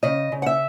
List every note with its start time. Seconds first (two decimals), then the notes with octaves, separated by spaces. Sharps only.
0.03 C#3 D#5
0.32 C#3
0.42 F#5
0.46 E5